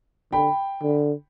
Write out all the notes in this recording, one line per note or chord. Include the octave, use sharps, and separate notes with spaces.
D3 G5 B5
D3